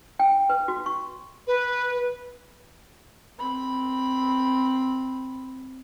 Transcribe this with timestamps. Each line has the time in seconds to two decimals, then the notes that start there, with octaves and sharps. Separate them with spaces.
0.19 G5
0.49 B4
0.68 F#4
0.86 C#6
1.47 B4
3.39 C4 B5